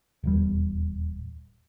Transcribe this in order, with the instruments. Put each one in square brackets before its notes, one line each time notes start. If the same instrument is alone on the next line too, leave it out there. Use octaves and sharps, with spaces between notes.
[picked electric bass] D#1 E2 G3